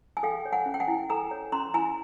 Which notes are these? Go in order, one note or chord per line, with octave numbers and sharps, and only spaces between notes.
G#5
A4 F5 G5
C#5
F#5 G#5
C#4
G5
F#5 G#5
E4
A4 G#5 A#5
C#5
C#4 A#5 C6
E4 G#5 A#5